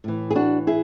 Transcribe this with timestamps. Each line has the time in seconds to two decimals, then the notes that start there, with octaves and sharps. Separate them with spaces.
0.04 A2 E3
0.31 G#4
0.35 D4 F#4
0.67 E4 G#4